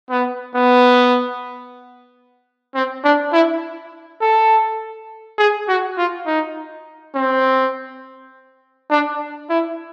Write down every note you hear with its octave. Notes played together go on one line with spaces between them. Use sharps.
B3
B3
C4
D4
E4
A4
G#4
F#4
F4
D#4
C4
D4
E4